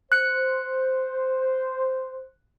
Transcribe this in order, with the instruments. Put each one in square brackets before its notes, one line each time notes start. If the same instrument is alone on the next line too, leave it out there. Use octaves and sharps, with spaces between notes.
[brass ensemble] C5 [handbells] F#6 C#7